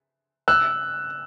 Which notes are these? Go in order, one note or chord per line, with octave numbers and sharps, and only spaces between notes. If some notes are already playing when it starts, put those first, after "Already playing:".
E6 F#6